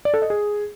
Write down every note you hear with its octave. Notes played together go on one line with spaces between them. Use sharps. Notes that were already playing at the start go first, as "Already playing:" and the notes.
D5
A4
D#5
G#4